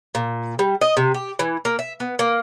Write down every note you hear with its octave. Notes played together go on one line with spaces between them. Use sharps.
A#2
G3
D#5
C3
G4
E3
A#3
E5
B3
A#3